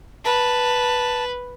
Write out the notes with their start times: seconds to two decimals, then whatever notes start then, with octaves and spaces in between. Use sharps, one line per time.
0.25 B4 A5